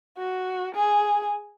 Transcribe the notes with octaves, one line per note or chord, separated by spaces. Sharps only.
F#4
G#4